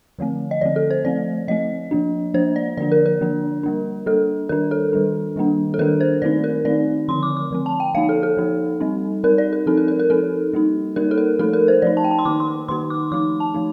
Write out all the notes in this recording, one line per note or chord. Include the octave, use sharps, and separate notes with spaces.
D3 F3 A3 C4
D#5
D3 F3 A3 C4 D5
A4
C5
F3 A3 C4 D5
F3 A3 C4 D#5
F3 A#3 D4
F3 A#3 D4 C5
D5
D3 F3 A#3 D4 D5
A#4
A#4
D3 F3 A#3 D4
G3 A#3 D4
G3 A#3 D4 A4
D#3 G3 D4 A#4
A4
D#3 G3 D4
D#3 G3 A#3 D4
A4
D#3 G3 A#3 D4 A#4
C5
D#3 A3 C4 D#4 D5
A#4
D#3 A3 C4 D#4 D5
D3 F3 C4 C6
D6
D6
D3 F3 C4
A5
G5
F3 A#3 D#4 F5
A4
A4
F3 A#3 D#4
G3 C4 D#4
G3 C4 D#4 A#4
D5
A#4
F3 C4 D#4 A4
A#4
A#4
A#4
F3 C4 D#4 A4
G3 A#3 D#4
G3 A#3 D#4 A#4
A4
A#4
F3 A3 D#4 A4
A#4
C5
F3 A3 D#4 D5
A5
G5
A5
C6
D#3 A#3 D#4 D6
C6
D#3 A#3 D#4 C6
D6
F3 A3 D#4 D6
A5
F3 A3 D#4